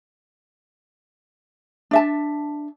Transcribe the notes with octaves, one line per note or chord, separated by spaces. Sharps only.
D4 E5 A5